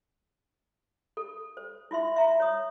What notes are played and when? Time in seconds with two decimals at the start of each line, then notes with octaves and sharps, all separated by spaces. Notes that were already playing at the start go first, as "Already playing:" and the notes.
1.17 A4
1.57 C5
1.91 E4 F4 E5 C6
2.16 E5 A#5 C#6
2.40 C#5 D#6